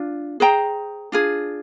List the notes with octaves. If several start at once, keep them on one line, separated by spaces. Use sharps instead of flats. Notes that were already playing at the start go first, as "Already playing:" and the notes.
Already playing: D4 F4
G#4 C5 G5 A#5
D4 F4 G#4